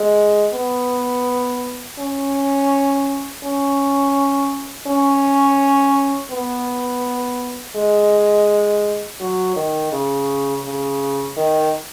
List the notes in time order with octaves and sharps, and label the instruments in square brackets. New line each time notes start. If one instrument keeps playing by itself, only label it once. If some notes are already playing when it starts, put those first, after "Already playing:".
Already playing: [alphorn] G#3
B3
C#4
C#4
C#4
B3
G#3
F#3
D#3
C#3
C#3
D#3